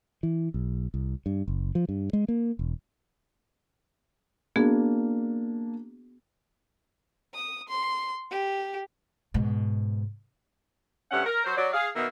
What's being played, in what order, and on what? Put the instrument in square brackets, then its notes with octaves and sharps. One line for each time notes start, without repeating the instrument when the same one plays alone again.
[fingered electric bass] E3
B1
C2
G2
F#1
F3
G2
G#3
A#3
E1
[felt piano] A#3 D4 [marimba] B3 F#4 G#4
[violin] D#6
C6
G4
[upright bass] G#2 B2
[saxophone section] G2 C3 A3 C#4 F#5
A#4
F#3 C5
F#3 D5
G#4 F5
B2 D#3 A#3 B3 A#4 E5